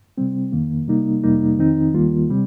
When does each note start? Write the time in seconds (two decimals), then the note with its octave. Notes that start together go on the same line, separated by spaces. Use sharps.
0.18 C3 G3 C4
0.52 F2 D#3 A#3
0.88 C3 G3 A#3 D#4
1.23 F2 C3 G3 A#3 D#4
1.58 F2 D#3 C4 D#4
1.94 D#2 D#3 G3 A#3 F4
2.29 C3 G3 C4